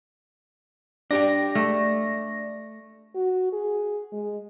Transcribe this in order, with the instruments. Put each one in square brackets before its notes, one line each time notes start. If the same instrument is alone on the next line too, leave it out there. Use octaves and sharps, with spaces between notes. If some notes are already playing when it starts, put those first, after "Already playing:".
[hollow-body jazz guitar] D4 G4 G5 [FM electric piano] D5 A#6
[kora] A3
[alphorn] F#4
G#4
G#3